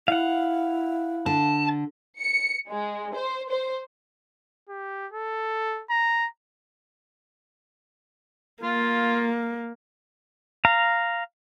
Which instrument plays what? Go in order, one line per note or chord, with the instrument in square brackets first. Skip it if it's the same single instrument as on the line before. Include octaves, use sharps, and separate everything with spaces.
[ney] E4 [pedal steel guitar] F5 F#5
[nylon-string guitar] D3 [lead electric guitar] A5
[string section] C#7
G#3
C5
C5
[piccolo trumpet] G4
A4
A#5
[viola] A#3 [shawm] F4
[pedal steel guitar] F5 A#5